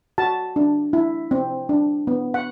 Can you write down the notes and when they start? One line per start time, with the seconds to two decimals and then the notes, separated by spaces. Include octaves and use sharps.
0.18 F#4 A5
0.56 D4
0.93 E4
1.31 C4
1.69 D4
2.07 B3
2.34 F#5